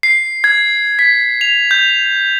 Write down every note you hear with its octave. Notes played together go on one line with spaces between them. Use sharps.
C7
G#6
B6
F7
G6